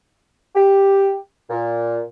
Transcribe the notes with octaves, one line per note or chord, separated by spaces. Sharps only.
G4
A#2